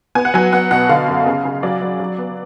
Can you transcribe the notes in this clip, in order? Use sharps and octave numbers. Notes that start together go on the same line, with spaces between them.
B3 G#5
F#5
F#3 G#5
B3 F#5
B2 F#5
D3 F5
F#2
C#3
C#3
F#3 D5
F#3
F#3
B3